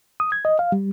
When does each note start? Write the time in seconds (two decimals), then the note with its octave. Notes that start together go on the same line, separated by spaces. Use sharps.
0.20 D#6
0.32 G#6
0.45 D#5
0.59 F5
0.72 G3